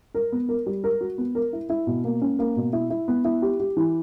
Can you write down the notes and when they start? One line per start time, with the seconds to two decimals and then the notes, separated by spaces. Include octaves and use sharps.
0.15 A#4
0.32 B3
0.49 A#4
0.66 G3
0.84 A#4
1.01 F#4
1.18 B3
1.35 A#4
1.53 E4
1.70 E4
1.87 B2
2.04 A#3
2.22 C#4
2.39 A#3
2.56 B2
2.73 E4
2.90 E4
3.08 B3
3.24 E4
3.42 G4
3.60 G4
3.77 E3